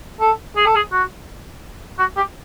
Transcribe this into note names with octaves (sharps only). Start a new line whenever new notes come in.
A4
G#4
A4
G#4
F#4
F#4
G4